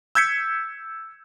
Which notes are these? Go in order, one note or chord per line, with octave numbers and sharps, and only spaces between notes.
E6 G6 G#6 B6 C#7